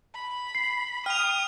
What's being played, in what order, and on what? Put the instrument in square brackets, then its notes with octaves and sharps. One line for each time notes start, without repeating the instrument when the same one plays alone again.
[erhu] B5
[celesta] C7
[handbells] G5 [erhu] D#6 [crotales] F6 F7